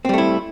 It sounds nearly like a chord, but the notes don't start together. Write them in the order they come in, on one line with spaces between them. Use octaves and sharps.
C4 G3 A3 E4